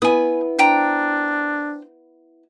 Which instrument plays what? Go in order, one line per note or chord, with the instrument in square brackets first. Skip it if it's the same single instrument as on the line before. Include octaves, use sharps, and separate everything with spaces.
[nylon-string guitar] B3 E4 B4 [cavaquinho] G#5 D#6
[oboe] D4 [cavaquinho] C5 G5 A#5